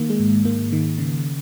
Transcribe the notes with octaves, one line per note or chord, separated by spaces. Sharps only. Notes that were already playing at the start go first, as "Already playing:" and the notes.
Already playing: D#3 A#3
G#3
G#2
G#2 A#3
D#3
C#3